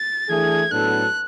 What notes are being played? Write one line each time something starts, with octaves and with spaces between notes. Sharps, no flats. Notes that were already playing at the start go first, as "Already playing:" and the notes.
Already playing: A6
E3 A3 D4 G#4 G#6
A2 F#3 B3 D4 A4 F#6